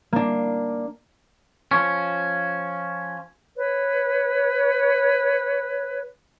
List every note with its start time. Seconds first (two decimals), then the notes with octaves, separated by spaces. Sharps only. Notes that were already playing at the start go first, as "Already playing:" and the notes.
0.13 A#3 D4
1.71 F3 C#4
3.56 B4 C#5